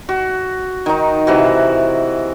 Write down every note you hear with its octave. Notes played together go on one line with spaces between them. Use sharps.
F#4
D#3 D#4
C3 E3 F#4